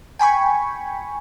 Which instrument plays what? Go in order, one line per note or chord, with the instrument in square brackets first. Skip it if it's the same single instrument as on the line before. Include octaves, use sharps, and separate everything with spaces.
[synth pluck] G5 G#5 B5 C#6